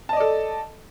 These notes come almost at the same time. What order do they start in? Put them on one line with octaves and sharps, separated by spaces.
A5 D#5 D5 A4